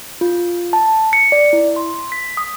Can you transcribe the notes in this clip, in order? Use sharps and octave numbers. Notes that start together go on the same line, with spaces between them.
F4
A5
C#7
D5
E4
C6
B6
D#6